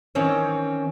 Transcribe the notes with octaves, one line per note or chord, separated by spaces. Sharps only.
D#3 E3 C4 C#4 C#5